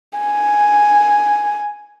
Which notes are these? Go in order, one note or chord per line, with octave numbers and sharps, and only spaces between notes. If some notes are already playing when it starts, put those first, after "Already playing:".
G#5